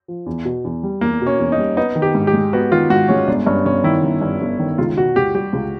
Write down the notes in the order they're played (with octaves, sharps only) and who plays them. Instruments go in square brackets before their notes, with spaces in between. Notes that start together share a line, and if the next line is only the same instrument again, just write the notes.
[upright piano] F3
E2
B2
E2
G3
[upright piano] E2 [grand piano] A#3
[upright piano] B2
[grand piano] C#4
[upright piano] E2
[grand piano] D#4
[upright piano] G3
[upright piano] B3 [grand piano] D#4
[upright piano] D#3
[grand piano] G4
[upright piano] G#2
[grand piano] G4
[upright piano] G#3
[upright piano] B3 [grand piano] F#4
[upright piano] D#3 [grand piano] F4
[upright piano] G#2 [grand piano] F#4
[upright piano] G#3 [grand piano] C#4
[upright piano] G1 [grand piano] D4
[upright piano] G2 [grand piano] C#4
[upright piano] G1 [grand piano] C#4
[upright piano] D#3 [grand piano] E4
[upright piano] G1
G2
G1
D#3
[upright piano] C#2 [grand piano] F4
[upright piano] B2 [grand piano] F#4
[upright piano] C#2 [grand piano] G4
[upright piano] G3 [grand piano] G4
[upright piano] C#2